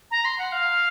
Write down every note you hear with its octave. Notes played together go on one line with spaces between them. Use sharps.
A#5
C6
F#5
F5